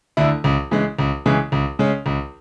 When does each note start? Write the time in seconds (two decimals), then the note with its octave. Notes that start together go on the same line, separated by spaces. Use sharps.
0.17 D2 D3 A3 E4
0.44 C#2
0.71 C#3 E3 G#3
0.99 C#2
1.26 C#3 E3 G#3
1.52 C#2
1.79 C#3 G#3 C#4
2.06 C#2